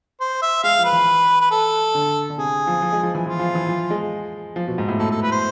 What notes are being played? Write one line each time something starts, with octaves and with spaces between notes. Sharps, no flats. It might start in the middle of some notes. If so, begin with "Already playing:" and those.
C5
E5
G#3 F5
F3
B4
E3
B4
A4
D3
D3
C3 G#4
F3
F3
G#3
F3
E3
F3 F4
F3
E3
F3
G#3
F3
B2
G#2
A2
A2 A4
A4
B4
C5